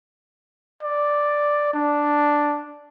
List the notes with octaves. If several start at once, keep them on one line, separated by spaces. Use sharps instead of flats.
D5
D4